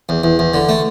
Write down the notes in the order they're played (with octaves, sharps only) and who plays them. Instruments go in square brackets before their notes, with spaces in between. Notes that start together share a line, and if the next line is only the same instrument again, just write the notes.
[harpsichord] E2
E2
E2
D3
A3